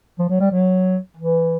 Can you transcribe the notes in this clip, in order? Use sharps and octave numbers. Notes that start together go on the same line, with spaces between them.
F3
F#3
G3
F#3
E3